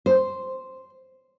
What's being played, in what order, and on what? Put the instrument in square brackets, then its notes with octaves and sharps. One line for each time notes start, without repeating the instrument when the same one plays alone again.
[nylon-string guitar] C5